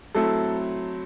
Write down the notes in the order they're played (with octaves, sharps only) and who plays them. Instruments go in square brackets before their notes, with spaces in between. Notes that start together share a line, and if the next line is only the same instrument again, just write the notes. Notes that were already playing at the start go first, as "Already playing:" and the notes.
[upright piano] F#3 A3 C4 E4 A4